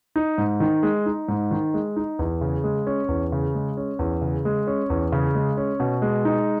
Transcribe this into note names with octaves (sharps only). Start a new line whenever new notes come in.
D#4
G#2
D#3
G#3
D#4
G#2
D#3
G#3
D#4
E2
C#3
G#3
C#4
E2
C#3
G#3
C#4
E2
C#3
G#3
C#4
E2
C#3
G#3
C#4
B2
G#3
D#4